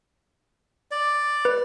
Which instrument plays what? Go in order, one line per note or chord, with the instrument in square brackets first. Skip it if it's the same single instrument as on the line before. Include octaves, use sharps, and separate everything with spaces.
[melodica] D5
[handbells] B4